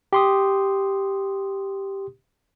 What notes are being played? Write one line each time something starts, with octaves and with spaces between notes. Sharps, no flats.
G4 C6 D#6